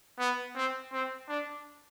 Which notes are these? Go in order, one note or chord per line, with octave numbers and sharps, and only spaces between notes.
B3
C4
C4
D4